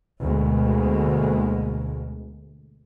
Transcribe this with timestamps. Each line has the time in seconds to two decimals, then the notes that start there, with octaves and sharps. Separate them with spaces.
0.22 D2 B2 G#3 A#3